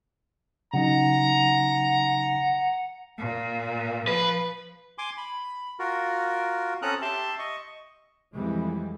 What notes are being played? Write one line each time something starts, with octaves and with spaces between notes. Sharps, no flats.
C#3 F#3 D#4 F#5 A#5
A#2
F3 B4
G#5 C6 D6
B5
F4 F#4 A#4
C4 C#4 A4 A#5 D#6 F#6
G4 E5 A5 C6
D#5 C#6
F2 E3 G3 G#3